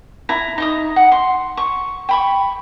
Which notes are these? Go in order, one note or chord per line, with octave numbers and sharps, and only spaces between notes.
E4 A#5
D#4 A#5 D#6
F#5
C6
C#6
G5 B5 C#6